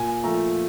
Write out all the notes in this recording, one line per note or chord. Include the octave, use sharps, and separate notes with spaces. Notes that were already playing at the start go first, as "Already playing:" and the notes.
Already playing: A#2 G#5
F3 A3 A#5